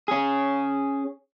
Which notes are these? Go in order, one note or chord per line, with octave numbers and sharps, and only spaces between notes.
C#4 G#4